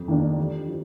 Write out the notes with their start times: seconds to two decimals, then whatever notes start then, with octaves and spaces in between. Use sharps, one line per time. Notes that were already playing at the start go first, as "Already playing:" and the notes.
Already playing: F2
0.08 D#3 A#3 D4
0.38 D#2
0.68 F3